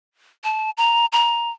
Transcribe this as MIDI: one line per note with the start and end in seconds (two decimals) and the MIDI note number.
0.44 0.70 81
0.77 1.06 82
1.12 1.51 82